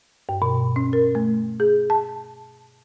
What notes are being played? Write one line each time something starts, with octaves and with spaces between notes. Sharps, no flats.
G2
B2
C#4
A#4
A3
G#4
A5